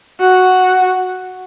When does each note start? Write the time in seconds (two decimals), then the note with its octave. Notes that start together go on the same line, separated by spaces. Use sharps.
0.20 F#4